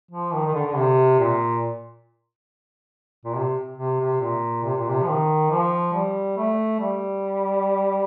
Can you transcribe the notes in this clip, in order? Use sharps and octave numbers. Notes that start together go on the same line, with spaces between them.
F3
D#3
D#3
D3
D3
C3
A#2
A#2
C3
C3
C3
A#2
C3
A#2
C3
F3
D#3
F3
G3
A3
G3